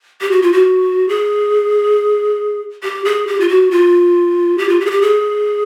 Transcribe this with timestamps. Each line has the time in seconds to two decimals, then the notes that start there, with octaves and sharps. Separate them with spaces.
0.21 G4
0.31 F#4
0.42 F4
0.53 F#4
1.09 G#4
2.83 G4
3.05 G#4
3.27 G4
3.40 F4
3.49 F#4
3.71 F4
4.58 G4
4.69 F4
4.80 G4
4.86 G#4
4.91 G4
5.02 G#4